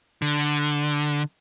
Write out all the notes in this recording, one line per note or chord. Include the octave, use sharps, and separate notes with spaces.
D3